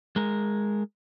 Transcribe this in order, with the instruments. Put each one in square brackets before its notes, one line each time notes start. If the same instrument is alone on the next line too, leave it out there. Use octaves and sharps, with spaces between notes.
[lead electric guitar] G#3 A#4